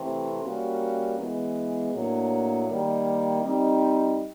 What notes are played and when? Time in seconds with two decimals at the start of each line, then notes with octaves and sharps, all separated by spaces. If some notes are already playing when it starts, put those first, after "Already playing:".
Already playing: C3 E3 A3 C4
0.43 G3 A#3 C#4 F#4
1.17 E3 G#3 B3
1.92 A2 F#3 A#3 D4
2.66 D#3 G3 A#3
3.42 G3 C4 D#4